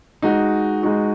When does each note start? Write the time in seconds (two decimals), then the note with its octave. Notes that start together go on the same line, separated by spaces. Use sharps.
0.22 G#3 D#4 F#4
0.83 G#3 D#4 F#4